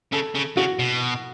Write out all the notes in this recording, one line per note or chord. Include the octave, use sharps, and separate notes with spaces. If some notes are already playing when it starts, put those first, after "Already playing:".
C#3 A4
C#3
C#3 F#4
B2